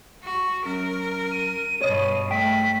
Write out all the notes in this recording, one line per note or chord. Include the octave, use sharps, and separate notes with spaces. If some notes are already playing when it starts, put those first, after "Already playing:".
F#4
F#2 A#4
D#7
G2 B2 C#5 D#5
A3 G5 B6